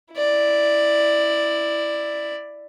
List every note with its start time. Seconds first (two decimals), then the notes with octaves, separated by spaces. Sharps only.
0.14 E4 D5